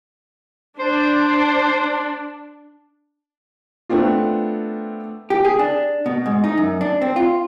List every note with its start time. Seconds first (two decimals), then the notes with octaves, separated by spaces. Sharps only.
0.79 D4 C5
3.89 A3 B3 C4 D4 F4
5.30 G4
5.45 G#4
5.59 D4
6.06 B2
6.26 G#2
6.44 D#4
6.58 F#2
6.81 D4
7.01 C4
7.16 F4